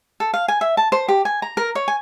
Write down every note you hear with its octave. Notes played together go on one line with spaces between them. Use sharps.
A4
F5
G#5
E5
A5
C5
G4
G#5
A#5
A#4
C#5
G#5